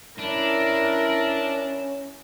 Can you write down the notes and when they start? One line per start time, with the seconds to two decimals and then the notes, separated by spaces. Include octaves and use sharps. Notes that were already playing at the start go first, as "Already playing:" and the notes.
0.19 C#4 D4 E4 A#4